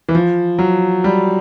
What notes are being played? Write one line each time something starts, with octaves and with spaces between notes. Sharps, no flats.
E3
F3
F#3
G3